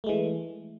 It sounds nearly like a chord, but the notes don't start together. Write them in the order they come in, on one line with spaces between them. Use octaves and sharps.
A3 G#3 E3